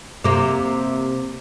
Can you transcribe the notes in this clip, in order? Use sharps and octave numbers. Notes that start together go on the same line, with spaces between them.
C3 A#3